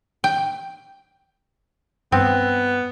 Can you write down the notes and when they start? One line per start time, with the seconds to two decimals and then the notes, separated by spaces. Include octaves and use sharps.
0.24 G5
2.12 G2 B3 C4